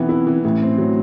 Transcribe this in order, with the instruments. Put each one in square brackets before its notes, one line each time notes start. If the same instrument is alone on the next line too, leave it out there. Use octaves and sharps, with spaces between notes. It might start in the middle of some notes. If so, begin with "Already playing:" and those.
Already playing: [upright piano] B1 E3 B3 [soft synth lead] C4
[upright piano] E4
E3
[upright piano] A1 [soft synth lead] A3
[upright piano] C4
F#3